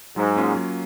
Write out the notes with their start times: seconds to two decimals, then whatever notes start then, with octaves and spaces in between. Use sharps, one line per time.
0.16 G#2 F#3
0.36 A#3 C#4 F4
0.56 F#3